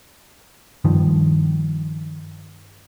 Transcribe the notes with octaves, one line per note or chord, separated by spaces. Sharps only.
G2 D#3 F3